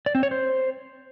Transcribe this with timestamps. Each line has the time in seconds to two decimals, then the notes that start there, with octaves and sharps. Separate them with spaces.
0.06 D5
0.15 C4
0.23 C#5
0.31 C5